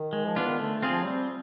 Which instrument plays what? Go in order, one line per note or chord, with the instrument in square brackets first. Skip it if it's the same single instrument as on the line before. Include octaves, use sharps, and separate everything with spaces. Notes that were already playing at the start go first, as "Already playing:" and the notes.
Already playing: [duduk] D#3
[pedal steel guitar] G#3
[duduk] F3
[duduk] E3 [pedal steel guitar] B3 D4 F4
[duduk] D#3
[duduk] D3 [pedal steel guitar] A3
[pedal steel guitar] C4 F4 G#4
[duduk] F3
[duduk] G3 [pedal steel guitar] C4